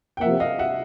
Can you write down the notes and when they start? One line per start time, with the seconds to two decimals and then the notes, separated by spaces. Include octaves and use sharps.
0.17 G5
0.21 C3 F3 A#3 E5 F#5
0.40 D#5 F5
0.59 E5 F#5